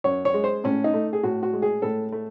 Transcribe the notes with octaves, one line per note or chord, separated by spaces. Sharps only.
F#2 C#5
C#5
G#3
C5
A2 C#4
D#4
A3
G#4
A2 F#4
F#4
G#3
G#4
A2 A4
A3